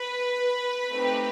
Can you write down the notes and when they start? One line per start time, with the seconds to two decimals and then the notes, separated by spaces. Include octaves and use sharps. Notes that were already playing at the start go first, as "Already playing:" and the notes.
Already playing: B4
0.92 A3 C4 D#4 G4